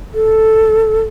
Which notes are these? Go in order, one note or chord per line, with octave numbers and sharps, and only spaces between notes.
A4